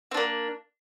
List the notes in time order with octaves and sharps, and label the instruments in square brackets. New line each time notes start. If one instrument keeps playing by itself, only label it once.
[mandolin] C4
D4
A#3